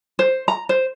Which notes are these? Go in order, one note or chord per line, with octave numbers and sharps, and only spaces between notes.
C5
A#5
C5